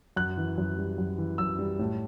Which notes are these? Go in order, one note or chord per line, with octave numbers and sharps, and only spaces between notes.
F#2 F#6
E3
F#2
G3
F#2
E3
F#2 E6
G3
A2